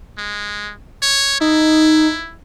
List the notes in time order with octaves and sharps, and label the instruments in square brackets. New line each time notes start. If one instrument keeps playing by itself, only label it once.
[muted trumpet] G#3
C#5
[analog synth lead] D#4 [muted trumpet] E4